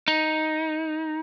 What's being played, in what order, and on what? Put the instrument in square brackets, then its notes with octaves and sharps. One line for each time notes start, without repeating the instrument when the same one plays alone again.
[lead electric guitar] D#4